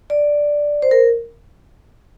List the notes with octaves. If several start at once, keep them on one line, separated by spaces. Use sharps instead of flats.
D5
C5
A#4